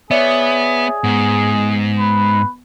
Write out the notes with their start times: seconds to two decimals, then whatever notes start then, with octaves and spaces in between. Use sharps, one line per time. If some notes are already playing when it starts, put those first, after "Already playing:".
0.11 B3 G#4 C#5 D5 E5
1.04 G#2 B3
1.99 B4